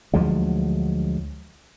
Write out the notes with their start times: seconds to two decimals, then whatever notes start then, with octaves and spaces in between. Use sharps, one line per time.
0.14 D2 F3 F#3 G#3